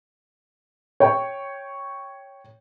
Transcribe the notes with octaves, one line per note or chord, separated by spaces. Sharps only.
C#5 G5